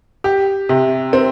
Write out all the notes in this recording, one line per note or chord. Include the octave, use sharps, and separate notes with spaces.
G4
C3
C4